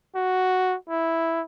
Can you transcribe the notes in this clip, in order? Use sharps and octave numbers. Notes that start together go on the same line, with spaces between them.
F#4
E4